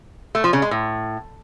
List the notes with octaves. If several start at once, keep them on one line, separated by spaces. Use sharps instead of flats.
A3
F3
C#3
G#3
A2